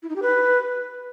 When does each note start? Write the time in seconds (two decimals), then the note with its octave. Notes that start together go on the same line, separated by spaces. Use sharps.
0.03 E4
0.09 D#4
0.16 G4
0.22 B4